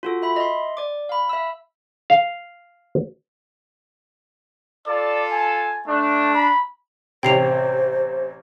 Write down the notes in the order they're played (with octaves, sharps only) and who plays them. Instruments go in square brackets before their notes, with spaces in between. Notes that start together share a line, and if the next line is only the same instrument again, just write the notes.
[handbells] F4 F#4 A4
E5 B5
D#5 E5 C6
D5 D6
F5 B5
E5 E6
[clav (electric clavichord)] F5
[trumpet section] F4 A4 A5 [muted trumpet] D5
[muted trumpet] G#5
[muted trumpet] A3 [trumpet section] D4
[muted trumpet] B5
[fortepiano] A1 C3 [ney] C5 [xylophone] G5 C7 F7